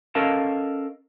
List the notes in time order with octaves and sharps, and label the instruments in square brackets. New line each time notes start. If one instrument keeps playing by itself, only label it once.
[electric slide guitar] C#4 A4 A#4 D#5 F5 A5